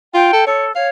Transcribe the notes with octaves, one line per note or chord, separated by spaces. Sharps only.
F4 G5
A4
A4 C#5
C#5 F5